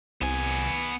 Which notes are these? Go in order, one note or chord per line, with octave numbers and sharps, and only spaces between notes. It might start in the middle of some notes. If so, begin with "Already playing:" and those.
C2 B3 G#5